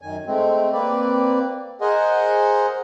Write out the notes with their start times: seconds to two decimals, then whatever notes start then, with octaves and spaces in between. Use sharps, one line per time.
0.02 F#2 D#3 G#5
0.26 G#3 A3 C4
0.73 A#3 C4 B4 D5
1.81 G#4 A#4 C5 D#5 F#5 G#5